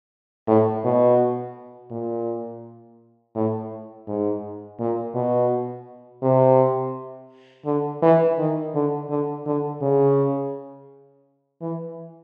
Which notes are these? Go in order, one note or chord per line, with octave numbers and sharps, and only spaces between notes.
A2
B2
A#2
A2
G#2
A#2
B2
C3
D3
E3
D#3
D3
D3
D3
C#3
E3